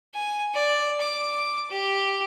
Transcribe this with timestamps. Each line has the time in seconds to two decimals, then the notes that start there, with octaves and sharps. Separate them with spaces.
0.15 G#5
0.54 D5
1.01 D6
1.71 G4